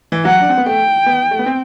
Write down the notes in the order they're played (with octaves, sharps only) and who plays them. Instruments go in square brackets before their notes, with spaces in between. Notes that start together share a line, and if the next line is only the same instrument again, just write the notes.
[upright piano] E3
[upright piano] F#3 [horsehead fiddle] F#5
[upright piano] D4
C4
B3
[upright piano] A3 [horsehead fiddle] G5
[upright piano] B3
A3
B3
C4